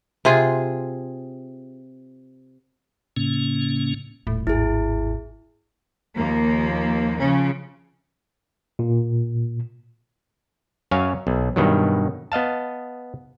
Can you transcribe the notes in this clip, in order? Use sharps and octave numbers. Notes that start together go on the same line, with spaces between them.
C3 F4 G#4
A2 C#3 A#3 C#4
D#1 A2
G#1 D#2 E4 G#4
D#2 F3 A#3
C#3 F3 C#4
A#2
F#2 C#5 F5 G#5
B1
G2 B2 D#3 F#3
B3 D#5 F5 A5